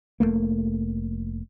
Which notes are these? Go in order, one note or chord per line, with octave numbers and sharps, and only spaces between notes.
F1 G2 A3 A#3